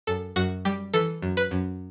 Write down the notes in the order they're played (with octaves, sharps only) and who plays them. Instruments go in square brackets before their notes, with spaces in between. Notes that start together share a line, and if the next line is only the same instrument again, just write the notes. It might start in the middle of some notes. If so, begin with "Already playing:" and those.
[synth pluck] F#2 A4
F#2 F#4
G3 G4
E3 A4
F#2
B4
F#2